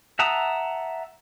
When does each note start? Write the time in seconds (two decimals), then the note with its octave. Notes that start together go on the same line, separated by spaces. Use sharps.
0.19 E5 F#5 A5 A#5 D#6